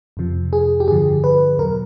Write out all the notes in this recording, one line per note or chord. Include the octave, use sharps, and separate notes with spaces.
F2 C3 F3
G#4
G4
G2 D3 F3 G#4
B4
E2 B2 F#3 A#4